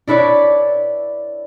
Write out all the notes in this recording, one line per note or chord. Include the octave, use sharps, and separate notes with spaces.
D4 E4 B4 C#5 D5